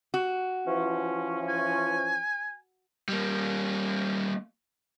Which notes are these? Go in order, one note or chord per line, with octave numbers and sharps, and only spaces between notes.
F#4
E3 F3 C#4
G#5
G3 A#3